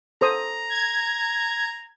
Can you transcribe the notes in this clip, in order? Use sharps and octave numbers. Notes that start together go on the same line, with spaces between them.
A4 C5 A#5 D#6
G#6